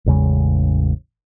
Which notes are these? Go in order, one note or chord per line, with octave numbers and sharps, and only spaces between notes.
A1 E2 C#3 G#3